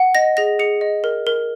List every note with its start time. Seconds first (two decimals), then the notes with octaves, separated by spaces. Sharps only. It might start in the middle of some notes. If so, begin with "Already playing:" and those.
Already playing: F#5
0.15 D#5 A#6
0.37 G#4 A#6
0.59 G#4 C#7
0.81 D#5
1.04 A#4
1.27 A#4